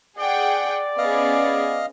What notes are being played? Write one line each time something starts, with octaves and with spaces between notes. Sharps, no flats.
G#4 D5 F#5 G5
B3 C#4 G#4 D#5 F5